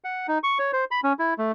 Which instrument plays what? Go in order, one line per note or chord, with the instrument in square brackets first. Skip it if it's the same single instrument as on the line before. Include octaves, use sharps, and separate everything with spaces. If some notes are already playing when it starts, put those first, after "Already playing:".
[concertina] F#5
D#4
C#6
C#5
C5
B5
C#4
E4
A3